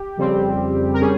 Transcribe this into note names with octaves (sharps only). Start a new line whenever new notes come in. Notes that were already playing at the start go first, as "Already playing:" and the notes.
Already playing: G4
F2 C#3 G3 C4
A#4
G3 C#4 G#4